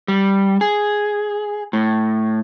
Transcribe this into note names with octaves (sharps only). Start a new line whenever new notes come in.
G3
G#4
A2